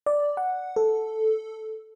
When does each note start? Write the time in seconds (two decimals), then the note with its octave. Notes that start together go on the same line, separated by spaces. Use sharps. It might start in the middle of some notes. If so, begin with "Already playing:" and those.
0.06 D5
0.37 F#5
0.76 A4